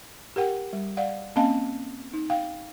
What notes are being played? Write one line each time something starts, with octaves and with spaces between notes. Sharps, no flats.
G4 A#4 F#5 G5
G3
D5 F5 F#5
A#3 C4 C#4 D#5 F5 A5
D#4
F5 G5